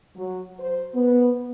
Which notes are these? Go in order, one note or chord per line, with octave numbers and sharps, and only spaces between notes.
F#3
C5
B3